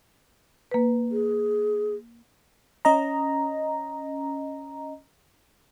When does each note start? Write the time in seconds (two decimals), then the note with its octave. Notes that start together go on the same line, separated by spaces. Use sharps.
0.71 A#3 B4
1.11 G#4
2.85 C#4 D#5 A#5